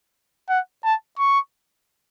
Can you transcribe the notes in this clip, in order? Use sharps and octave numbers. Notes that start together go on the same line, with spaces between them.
F#5
A5
C#6